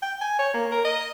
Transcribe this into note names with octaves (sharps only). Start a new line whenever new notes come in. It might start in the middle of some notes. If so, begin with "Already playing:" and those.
G5
G#5
C#5
A#3
A#4
D#5